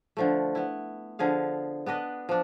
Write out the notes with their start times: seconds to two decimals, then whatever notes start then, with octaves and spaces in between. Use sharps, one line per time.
0.17 D3 F3 A3
0.55 B3 E4
1.19 D3 F3 G#4 F5
1.86 B3 D4 B4 D#5
2.29 F3 D4